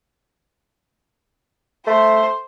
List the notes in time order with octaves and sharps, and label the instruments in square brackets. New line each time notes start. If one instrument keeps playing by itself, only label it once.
[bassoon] A3 [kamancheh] C5